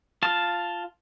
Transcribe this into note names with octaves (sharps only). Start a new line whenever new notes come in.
F4 F5 A5